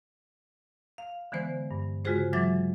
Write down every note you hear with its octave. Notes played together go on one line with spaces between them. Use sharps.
F5
D3 E3 G#3 B3 C5
G2
C#3 G#3 F4 F#4 G#4 C5
E3 F#3 G#3 E5 D6 A6